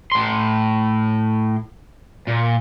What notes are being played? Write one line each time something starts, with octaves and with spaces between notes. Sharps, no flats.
A2 C6
A#2